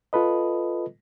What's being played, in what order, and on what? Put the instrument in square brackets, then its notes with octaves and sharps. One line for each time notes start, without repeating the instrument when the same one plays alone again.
[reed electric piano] F4 A4 B4 D#5